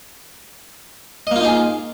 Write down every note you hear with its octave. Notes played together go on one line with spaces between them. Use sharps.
A#3 D#4 F4 G#4 D#5